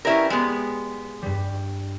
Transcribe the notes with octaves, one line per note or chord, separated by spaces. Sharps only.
C#4 E4 G4 A#4 B4 D5
G#3 B3
G2 G3